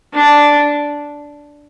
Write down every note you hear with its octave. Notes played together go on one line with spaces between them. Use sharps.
D4